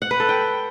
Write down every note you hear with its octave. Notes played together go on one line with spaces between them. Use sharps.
F#5
B4
A4
G5